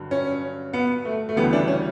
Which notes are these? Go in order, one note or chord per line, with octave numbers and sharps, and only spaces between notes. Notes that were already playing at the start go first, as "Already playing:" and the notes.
Already playing: G2 D3 F#3
C#4
B3
A3
A3
D2 C#3 E3 G3 B3
D4
C#4